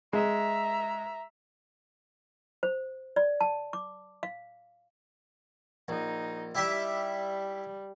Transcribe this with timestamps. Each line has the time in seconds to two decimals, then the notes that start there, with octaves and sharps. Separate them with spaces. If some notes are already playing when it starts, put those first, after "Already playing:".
0.13 G#3 E5 A#5
2.63 C5
3.16 D5
3.41 A5
3.73 D6
4.23 F5
5.88 A#1 D#4
6.55 G3 E4 G4 E5